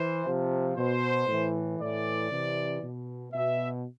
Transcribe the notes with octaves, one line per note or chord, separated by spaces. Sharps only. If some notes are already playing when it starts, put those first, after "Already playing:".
Already playing: E3 C5
C3 F3
B2 C5
A2 E3
A2 E3 D5
C3 E3
B2
B2 E5